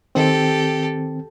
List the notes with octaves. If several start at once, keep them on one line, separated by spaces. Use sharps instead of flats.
D#3 C4 G4 A4